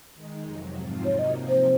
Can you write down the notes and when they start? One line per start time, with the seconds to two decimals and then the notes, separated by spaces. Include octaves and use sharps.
0.15 D#3 G#3 D#4
0.44 F2 C3 F#3
0.75 G#2 F3 C4 F4
1.04 C3 F#3 A#3 D#4 C#5
1.19 D#5
1.34 C3 F3 C4
1.49 C5